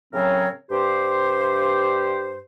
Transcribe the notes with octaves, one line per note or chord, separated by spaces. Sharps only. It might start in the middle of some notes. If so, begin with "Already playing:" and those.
A2 C#3 F#3 C4 A#4 C#5
G2 G4 C5